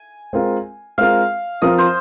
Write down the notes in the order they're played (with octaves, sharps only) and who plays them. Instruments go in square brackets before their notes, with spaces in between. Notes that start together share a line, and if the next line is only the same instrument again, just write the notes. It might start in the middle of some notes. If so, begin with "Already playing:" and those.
Already playing: [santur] G#5
[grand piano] G#3 C4 F4 A#4
[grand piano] G#3 C4 F4 A#4 [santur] F5
[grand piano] F3 C4 F4 A#4 [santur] D#5
[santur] C5